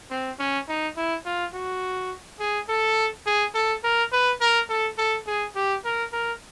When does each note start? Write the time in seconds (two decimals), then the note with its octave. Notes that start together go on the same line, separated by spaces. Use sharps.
0.11 C4
0.39 C#4
0.68 D#4
0.97 E4
1.25 F4
1.54 F#4
2.40 G#4
2.69 A4
3.26 G#4
3.55 A4
3.84 A#4
4.12 B4
4.41 A#4
4.69 A4
4.98 A4
5.27 G#4
5.55 G4
5.85 A#4
6.13 A#4